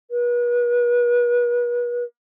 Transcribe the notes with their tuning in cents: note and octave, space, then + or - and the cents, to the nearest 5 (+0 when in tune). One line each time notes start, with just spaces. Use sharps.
B4 -40